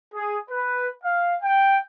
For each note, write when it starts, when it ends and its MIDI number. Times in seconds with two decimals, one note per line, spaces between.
0.14 0.36 68
0.49 0.88 71
1.03 1.35 77
1.42 1.78 79